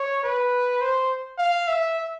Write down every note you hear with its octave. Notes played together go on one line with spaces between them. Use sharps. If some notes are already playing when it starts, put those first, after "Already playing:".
Already playing: C#5
B4
C5
F5
E5